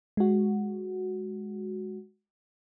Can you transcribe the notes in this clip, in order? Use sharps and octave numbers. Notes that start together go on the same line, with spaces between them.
G#3 F#4